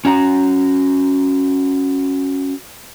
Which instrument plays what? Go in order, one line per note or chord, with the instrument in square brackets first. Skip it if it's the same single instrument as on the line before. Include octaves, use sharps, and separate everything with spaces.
[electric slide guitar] C#4 F#4 A#5